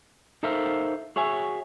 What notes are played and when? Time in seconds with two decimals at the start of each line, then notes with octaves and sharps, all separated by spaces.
0.43 D#4 A4 A#4 C5 E5 F5
1.16 F#4 G#4 C#5 E5 G#5